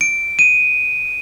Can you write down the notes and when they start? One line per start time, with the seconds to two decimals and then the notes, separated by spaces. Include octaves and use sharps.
0.01 D7
0.39 D#7